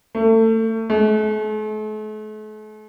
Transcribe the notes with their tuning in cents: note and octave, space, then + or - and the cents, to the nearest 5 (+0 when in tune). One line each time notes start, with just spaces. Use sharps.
A3 +30
A3 -45